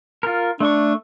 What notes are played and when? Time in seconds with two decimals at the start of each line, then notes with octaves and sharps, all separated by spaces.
0.23 F4 A#4
0.60 A3 D4 C#6